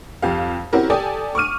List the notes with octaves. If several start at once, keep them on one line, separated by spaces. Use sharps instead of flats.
F2 G4 F5
C4 C#4 E4 F#4 G4 A#4
G4 A4 D5 G5 G#5 D#6
C#6 D6 F6 D#7